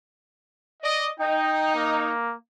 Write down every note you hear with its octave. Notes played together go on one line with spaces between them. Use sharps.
D5 D#5
D#4 G5
A#3